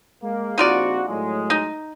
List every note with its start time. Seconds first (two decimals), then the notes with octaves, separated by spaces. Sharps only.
0.22 G#3 A#3
0.58 A#1 C4 D#4 F4 F#4 D5
1.08 A2 F#3 G#3
1.50 D#4